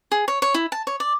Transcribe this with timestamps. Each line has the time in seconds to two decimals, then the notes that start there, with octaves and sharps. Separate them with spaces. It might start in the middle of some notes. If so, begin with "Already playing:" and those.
0.12 G#4
0.28 C#5
0.42 C#5
0.54 E4
0.72 A5
0.87 C#5
1.00 D5